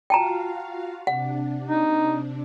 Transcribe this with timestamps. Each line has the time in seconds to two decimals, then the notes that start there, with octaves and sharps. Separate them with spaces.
0.10 F4 F#4 F5 G5 A5 A#5
1.07 C3 D4 F#5
1.67 D#4